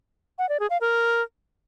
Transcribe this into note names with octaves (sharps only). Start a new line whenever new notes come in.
F#5
D5
G#4
F5
A#4